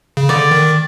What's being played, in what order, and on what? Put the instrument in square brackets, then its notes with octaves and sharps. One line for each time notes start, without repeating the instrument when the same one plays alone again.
[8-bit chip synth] C#3
[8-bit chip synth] D3 [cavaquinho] D5
[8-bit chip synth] D#3